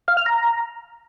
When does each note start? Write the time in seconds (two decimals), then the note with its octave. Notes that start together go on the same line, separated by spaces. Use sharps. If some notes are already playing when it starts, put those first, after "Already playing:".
0.08 F5
0.17 F6
0.26 A#5